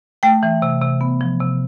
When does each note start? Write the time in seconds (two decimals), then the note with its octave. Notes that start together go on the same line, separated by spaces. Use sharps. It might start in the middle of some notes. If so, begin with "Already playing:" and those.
0.23 A3 G5
0.43 E3
0.62 C3
0.82 C3
1.01 B3
1.21 F3
1.40 C3